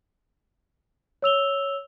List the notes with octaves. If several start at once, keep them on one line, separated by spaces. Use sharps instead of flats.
C#5 E6 F7 G7